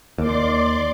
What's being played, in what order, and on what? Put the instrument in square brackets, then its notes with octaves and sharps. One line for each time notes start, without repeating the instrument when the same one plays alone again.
[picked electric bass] D#2 [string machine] D5 C6 D6